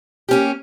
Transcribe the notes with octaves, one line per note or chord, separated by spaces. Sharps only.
A#3 C#4 G4